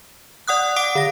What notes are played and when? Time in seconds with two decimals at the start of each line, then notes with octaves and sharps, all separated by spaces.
0.48 D5 F#5 D#6 F#6
0.76 F#5 D6 D7
0.95 D3 A#6